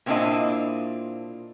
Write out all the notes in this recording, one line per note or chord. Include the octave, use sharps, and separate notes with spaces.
A#2 A#3 C4 D4 E4 D#5